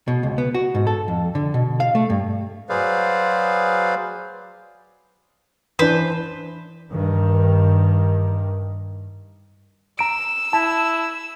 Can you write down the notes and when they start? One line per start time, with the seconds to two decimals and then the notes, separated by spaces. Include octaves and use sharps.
0.08 B2
0.23 C#2
0.38 B3
0.55 F#4
0.75 G#2
0.87 A4
1.08 F2
1.35 D3
1.54 B2
1.80 F5
1.95 A3
2.10 G2
2.69 F#3 G#4 B4 C5 D5 F5
5.79 E3 D4 B4 C5
6.91 G2 D#3
9.99 A#5 E6 D7
10.53 E4 A5